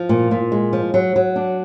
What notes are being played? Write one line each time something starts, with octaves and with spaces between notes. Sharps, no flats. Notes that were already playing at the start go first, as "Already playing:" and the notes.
Already playing: F3
A#2
A#2
G#3
F3
F#3
F#3
D4